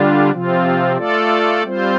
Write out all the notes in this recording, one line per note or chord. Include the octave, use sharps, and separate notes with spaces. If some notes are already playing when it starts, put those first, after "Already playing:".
Already playing: D3 G3 D4 F4
C3 F3 C4 F4
A3 F4 A4 D5
G3 C4 F4 C5